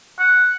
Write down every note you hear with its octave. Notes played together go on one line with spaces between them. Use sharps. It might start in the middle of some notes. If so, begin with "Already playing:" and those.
F#5